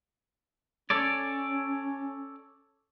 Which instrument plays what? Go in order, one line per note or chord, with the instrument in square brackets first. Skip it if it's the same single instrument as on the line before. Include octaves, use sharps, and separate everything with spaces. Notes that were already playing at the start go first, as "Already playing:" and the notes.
[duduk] C#4 [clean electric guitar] A4 C#5 D5